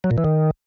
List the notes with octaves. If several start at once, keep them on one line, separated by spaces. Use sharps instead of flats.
F#3
A#2
E3
D#3